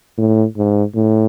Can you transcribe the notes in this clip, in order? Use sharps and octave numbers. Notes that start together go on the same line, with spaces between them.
A2
G#2
A2